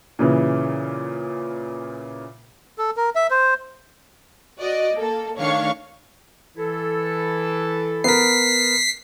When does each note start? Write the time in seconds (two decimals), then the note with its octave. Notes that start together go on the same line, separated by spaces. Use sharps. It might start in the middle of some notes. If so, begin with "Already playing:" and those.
0.19 A#2 C#3 E3
2.78 A4
2.97 A#4
3.15 E5
3.30 C5
4.59 F#4 D5 D#5
4.95 A#3 A4
5.39 D#3 A3 D4 C#5 F5 C#6
6.57 E3 E4 A4
8.04 B3 A#4 B6 C7